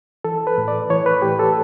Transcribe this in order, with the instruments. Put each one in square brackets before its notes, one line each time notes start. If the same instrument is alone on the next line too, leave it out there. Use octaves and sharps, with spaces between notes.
[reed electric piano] E3 A4
B4
A2
D5
E3 C#5
B4
A2 G4
A4